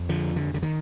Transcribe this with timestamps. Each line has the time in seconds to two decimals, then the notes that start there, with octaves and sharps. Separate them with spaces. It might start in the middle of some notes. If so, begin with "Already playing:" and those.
Already playing: F2
0.09 D3 F3
0.36 D3
0.54 D3
0.63 D#3